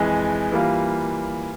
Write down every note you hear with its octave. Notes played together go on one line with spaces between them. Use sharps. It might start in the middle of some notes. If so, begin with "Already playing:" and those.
Already playing: F2 E3 G#3
E3 G3 A#3 F4